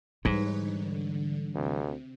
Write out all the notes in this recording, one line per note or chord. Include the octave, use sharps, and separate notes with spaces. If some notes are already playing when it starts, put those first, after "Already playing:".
G#2 E3 G3 D#4 B4 C#5
D3
D2 C3